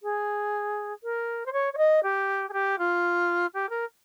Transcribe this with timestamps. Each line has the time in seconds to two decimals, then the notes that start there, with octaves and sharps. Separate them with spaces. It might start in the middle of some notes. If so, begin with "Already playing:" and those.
0.03 G#4
1.03 A#4
1.46 C5
1.53 C#5
1.73 C#5
1.77 D#5
2.03 G4
2.49 G#4
2.53 G4
2.79 F4
3.54 G4
3.69 A#4